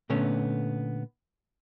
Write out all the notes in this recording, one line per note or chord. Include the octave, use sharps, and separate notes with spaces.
A#2 D3 A3 B3 C#4